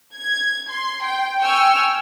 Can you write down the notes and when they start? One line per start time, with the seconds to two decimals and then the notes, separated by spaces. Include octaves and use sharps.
0.16 G#6
0.69 C6
1.03 G5
1.40 G5 G#5 C#6 E6 F6